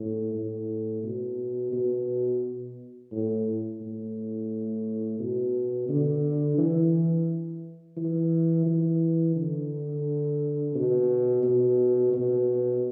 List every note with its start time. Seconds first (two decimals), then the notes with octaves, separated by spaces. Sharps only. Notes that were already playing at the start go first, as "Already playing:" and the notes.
Already playing: A2
0.34 A2
1.03 B2
1.72 B2
3.12 A2
3.81 A2
5.19 B2
5.89 D3
6.58 E3
7.97 E3
8.66 E3
9.36 D3
10.75 B2
11.43 B2
12.13 B2